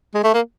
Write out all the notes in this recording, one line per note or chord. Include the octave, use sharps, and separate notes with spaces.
G#3
A3
A#3